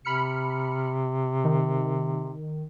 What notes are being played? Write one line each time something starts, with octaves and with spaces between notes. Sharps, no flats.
C3 B5 F6 C#7
D#3